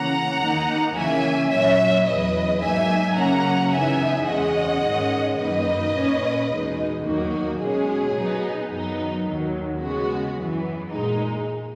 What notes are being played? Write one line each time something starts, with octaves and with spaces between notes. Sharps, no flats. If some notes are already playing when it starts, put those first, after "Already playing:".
Already playing: C#3 E3 A#3 C#4 F#5 A#5
D#2 D#3 A#3 D#4
C#3 E3 A#3 C#4 E5 G#5
A#2 F#3 C#4 C#5 E5
E2 C#3 F#3 B4 D#5
G#2 F#3 A#3 D#4 E5 G#5
C#3 F#3 A#3 C#4 F#5 A#5
F#2 C#3 E3 B3 D#4 E5 G#5
E2 B2 G#3 C#4 D#5 F#5
G#2 D#3 G#3 C#4
F#2 D#3 A#3 D#4 B4 D#5
A#2 A#3 C#4
E2 B2 G#3 D#4
D#2 D#3 F#3 A#3 D#4 F#4
B2 G#3 C#4 G#4
B2 F#3 B3 D#4
F#2 D#3 F#3 B3 D#4
D#2 D#3 F#3
C#3 G#3 B3 F#4
F#2 E3 B3
A#2 G#3 D#4